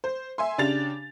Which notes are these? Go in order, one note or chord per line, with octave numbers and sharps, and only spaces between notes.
C5
E5 G#5 C6
C#3 D4 G4 A6 F7